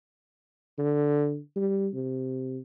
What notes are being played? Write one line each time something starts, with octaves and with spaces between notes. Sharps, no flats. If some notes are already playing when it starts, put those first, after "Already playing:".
D3
G3
C3